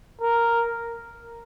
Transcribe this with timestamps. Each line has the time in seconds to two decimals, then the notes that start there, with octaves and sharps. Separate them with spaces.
0.22 A#4